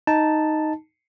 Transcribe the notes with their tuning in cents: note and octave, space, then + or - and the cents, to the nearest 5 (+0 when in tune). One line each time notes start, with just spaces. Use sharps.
D#4 +0 A5 +0